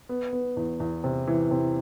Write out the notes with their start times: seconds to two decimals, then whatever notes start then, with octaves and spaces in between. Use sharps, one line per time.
0.09 B3
0.33 B3
0.57 E2
0.80 E2
1.04 C3
1.27 E3
1.51 C3